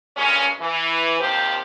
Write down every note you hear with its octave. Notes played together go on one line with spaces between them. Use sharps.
G2 A#2 G#3 C#4
E3
D#2 C3 F3 G4 C5